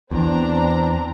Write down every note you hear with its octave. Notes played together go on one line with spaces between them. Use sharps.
E2 C4 D4 A#5